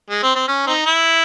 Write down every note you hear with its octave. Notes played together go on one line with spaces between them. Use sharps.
G#3
C4
C4
C#4
C4 D#4
E4